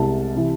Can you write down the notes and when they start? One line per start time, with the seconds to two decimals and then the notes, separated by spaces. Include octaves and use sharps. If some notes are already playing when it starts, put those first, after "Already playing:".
Already playing: C2 C3 G#3 A5
0.35 C3 E3